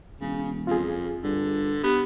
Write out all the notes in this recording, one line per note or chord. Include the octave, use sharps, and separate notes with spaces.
E1 C#3
F2 F4 G#4
G2 D3
B3 G4